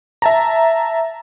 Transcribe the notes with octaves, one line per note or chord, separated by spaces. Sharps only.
E5 A5 A#5